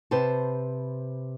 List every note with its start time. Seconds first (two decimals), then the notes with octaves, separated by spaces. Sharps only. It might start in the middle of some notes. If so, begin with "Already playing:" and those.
0.11 C3 B4 C5 A5